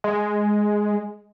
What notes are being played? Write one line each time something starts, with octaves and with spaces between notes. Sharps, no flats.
G#3